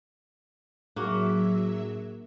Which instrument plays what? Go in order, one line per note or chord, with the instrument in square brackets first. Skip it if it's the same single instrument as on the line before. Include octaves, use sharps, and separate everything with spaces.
[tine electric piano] A2 D4 G#4 [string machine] F#3 E5 [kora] A#3 F#4